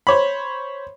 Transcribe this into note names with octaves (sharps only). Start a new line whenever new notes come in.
C5 C#5 B5